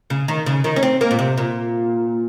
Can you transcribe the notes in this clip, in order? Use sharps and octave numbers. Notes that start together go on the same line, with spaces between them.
C#3
D#3
C#3
D#3
C#4
C4
A#3
A#2
C3
A#2